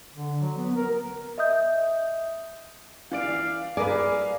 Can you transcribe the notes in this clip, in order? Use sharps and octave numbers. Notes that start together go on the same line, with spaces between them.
D3
F#3
B3
A#4
D#5 E5 D#6 G6
E3 D5 F5 D7
G#4 A#4 B4 D5 F5